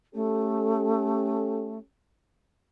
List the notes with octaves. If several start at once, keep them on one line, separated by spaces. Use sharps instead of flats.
A3 C#4 G4 A4